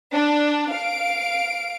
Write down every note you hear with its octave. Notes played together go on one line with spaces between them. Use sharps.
D4
F5 D7